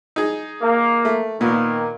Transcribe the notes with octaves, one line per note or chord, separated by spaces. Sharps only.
D#4 G#4
A#3
A3
A#2 D#3 A#3 B3